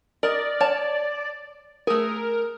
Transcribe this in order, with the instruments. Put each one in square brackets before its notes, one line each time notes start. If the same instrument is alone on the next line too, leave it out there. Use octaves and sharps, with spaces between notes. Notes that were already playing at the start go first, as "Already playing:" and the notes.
[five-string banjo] A#4 D#5 [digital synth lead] D5
[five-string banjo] C#5 A5
[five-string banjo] A3 G#4 [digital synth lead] A#4